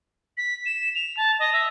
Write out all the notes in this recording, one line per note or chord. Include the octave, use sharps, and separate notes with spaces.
B6
E7
F7
A5
D#5
E5